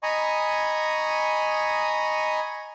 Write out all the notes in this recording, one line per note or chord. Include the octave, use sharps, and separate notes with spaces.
D#5 G#5 A#5 B5 C#6 D#6